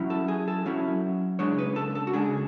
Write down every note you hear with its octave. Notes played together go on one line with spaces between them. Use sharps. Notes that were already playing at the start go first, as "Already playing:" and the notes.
Already playing: F#3 C#4 E4
A4
G#4
A4
F#3 C#4 E4
C#3 G#3 D4 C#5
B4
A4
A4
F#4
C#3 G#3 D4 G#4